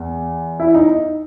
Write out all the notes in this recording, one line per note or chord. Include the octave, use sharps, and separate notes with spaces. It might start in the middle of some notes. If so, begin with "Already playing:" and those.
Already playing: E2
E4
D#4